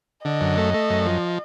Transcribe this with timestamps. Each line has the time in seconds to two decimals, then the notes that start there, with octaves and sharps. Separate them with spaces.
0.24 D3 D#5
0.41 F#2
0.58 A3
0.74 A3
0.90 F#2
1.06 F3